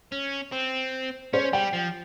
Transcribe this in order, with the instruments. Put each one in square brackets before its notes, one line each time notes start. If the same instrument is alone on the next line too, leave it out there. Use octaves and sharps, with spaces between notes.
[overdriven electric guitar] C#4
C4
[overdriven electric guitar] C#4 [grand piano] C5
[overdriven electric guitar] G3 [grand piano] G5
[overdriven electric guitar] F3